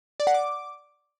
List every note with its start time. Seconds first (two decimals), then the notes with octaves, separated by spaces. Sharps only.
0.20 D5
0.27 F#5
0.34 D6